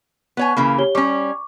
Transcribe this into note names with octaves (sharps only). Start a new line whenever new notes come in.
B3 C#5 G#5
C#3 E3 A#3 B5
G4 C#5 G7
G3 C#4 C#6 D6